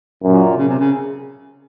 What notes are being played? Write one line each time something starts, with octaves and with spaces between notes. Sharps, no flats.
F#2 A#2
C#3
C3
C#3